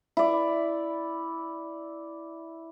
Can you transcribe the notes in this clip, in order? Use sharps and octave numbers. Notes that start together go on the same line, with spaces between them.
E4 D5